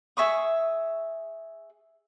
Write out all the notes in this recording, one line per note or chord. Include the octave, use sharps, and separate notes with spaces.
G#4 E5 C#6 D#6